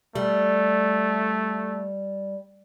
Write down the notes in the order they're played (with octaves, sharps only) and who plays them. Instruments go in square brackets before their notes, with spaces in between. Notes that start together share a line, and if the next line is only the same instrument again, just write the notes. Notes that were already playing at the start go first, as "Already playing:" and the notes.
[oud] G3 [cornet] A3